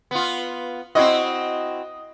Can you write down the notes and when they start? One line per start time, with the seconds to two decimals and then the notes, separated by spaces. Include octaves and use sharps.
0.11 B3 F4
0.95 C4 E4 F#4 D#5